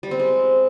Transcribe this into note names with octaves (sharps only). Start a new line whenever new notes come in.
G3
C4
G#3